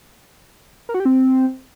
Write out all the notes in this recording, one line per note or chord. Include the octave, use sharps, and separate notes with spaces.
A#4
F#4
G4
C4